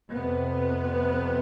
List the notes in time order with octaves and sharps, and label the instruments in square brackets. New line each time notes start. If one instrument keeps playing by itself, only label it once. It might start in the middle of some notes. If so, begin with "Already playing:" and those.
[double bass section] F2 C3 B3